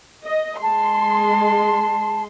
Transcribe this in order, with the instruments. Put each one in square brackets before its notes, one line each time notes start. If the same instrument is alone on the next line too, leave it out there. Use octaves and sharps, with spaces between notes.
[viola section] D#5
[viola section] G#3 C6 [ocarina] A5